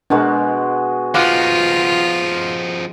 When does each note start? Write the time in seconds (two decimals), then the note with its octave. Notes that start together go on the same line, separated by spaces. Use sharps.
0.10 B2 G#3 D4 F#4 A#4
1.14 F3 D#4 F4 F5 F#5 D6